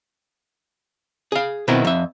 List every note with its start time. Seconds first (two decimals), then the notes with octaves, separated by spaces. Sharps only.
1.32 G#4 F5
1.68 B2 D#3 B3 C4 E4 A#4
1.85 F2 E5